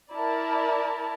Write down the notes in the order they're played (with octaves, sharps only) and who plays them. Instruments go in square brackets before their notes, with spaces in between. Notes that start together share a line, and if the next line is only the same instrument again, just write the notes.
[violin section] E4 A#4 D5 A5